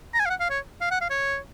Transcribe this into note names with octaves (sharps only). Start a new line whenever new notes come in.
A#5
G#5
F5
F#5
F5
C#5
F5
F#5
F5
C#5